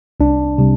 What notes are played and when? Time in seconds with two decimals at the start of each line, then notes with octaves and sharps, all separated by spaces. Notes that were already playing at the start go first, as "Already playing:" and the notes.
0.20 C2 D4
0.58 C3 G3